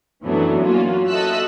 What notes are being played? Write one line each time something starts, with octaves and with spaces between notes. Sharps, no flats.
F#2 E3 F#3 A3 B3 D4
A#3 C#4 F4 F#4
F#4 A4 D#5 E5 E6 F#6